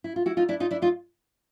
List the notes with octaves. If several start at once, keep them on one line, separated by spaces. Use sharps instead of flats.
E4
F4
E4 F#4
D#4 F4
D4 E4
D#4 F4
D4 E4
D#4 F4